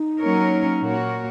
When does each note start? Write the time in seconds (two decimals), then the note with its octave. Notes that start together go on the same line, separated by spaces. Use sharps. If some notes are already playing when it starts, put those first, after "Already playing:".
Already playing: D#4
0.19 F#3 A#3 C#4 A#4 C#5
0.80 A#2 A#3 F#4 A#4 C#5